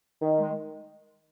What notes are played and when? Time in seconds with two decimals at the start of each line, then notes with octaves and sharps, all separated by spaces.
0.22 D#3
0.40 G#3